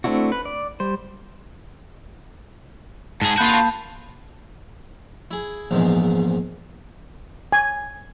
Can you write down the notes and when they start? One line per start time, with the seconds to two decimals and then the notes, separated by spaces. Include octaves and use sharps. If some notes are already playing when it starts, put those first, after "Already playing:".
0.04 A3 C4 D4 E4 F#4
0.32 B4
0.45 D5
0.80 G3 C5
3.22 G#2 G#4 A5
3.38 A#3 F4 F#4 B5 G6
3.54 A5
5.31 E4 G#4
5.71 A#1 E2 G#2
7.52 G#5